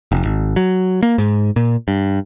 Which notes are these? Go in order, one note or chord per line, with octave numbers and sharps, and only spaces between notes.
F1
G#1
F#3
A#3
G#2
A#2
G2